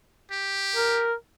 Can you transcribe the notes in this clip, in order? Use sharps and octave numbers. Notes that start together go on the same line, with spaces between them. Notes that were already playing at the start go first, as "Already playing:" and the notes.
G4
A#4